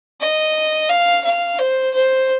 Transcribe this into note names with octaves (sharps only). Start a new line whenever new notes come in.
D#5
F5
F5
C5
C5